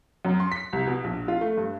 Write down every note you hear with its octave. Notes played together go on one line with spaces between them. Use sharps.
F#2
C6
B6
C2
B2
A#1
F4
A3
G2